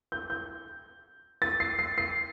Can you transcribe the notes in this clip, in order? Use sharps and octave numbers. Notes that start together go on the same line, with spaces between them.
G6
G6
A6
C7
C7
C7